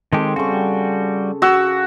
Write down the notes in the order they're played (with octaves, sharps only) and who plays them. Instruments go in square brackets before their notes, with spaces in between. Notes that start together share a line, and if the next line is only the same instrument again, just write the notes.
[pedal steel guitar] D#3 G#3 G4 [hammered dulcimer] C4 A4 C5
[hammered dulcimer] C#3 C#6 [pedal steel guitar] G3 F#4
[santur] F#4 E6